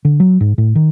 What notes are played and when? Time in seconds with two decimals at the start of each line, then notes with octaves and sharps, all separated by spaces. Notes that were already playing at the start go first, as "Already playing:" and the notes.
0.05 D3
0.20 F#3
0.41 G#2
0.58 A2
0.75 D#3